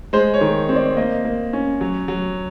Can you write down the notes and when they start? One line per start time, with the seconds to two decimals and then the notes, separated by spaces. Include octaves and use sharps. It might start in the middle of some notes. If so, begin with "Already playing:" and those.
0.13 G#3 C5
0.34 C#5
0.41 D#3
0.69 C4
0.76 D5
0.97 A#3 D#5
1.25 A#3
1.53 C#4
1.81 F#3
2.08 F#3